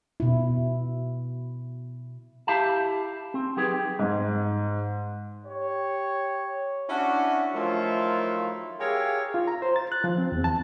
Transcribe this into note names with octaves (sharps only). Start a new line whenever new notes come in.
B2 E4
E4 G4 E5 F5 A5
C4
F#3 C4 D#4 G4 G#4 B4
G#2
G4 C#5
C#4 D4 E4 F#4
D#3 F3 F#3 A3 E4 F4
G4 G#4 A#4 C#5 E5 F5
F4
A#5
C5
A6
F#6
F3
C4
E2
A5